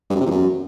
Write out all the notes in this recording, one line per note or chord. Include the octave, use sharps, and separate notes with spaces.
G2
F#2
C3
E2
F#2